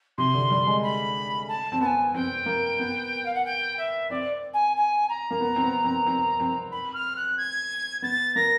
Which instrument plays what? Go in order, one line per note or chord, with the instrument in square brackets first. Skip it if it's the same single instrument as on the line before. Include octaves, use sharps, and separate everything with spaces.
[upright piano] C3 [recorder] C6
[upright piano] D3
G3
G#3
[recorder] B5
A5
[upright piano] C4
[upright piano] B3 [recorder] A5
[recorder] G#5
[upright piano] C4 [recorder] G5
[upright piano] A#3
B3
[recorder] F5
F#5
G5
E5
[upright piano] C4 [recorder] D5
[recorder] G#5
G#5
A#5
[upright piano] A#3
B3
C4
B3
C4
C4
C4
[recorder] B5
F6
F#6
G#6
[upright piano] B3 [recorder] A6
[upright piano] A#3 [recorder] A#6